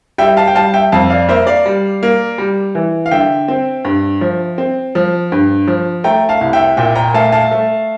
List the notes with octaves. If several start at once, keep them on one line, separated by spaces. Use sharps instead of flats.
G3 E5 G5
F5 A5
G5
G3 F5 A5
E5 G5
F2 F5 A5
D5 F5
A#3 C5 E5
D5 F5
G3
A#3
G3
E3
F5
D3 E5 G5
C4
G2
F3
C4
F3
G2
F3
A3 G5 A#5
F5 A5
C2
E5 G5
A#2 E5 G5
G5 A#5
A3 F5 A5
F5 A5
A3